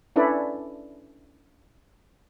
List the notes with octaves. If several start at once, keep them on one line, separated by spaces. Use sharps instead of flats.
C#4 D4 E4 A4 B4 D5